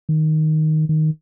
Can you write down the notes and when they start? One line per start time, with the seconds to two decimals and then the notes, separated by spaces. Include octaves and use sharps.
0.09 D#3
0.89 D#3